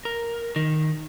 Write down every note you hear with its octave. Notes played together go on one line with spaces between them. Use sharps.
A#4
D#3